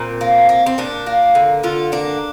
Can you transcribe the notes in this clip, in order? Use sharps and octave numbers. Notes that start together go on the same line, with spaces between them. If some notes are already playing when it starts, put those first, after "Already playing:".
Already playing: A#2 C4
A#3
A#3
C4
A#2 D4
A#3
D3
D3 F4
A#3 D4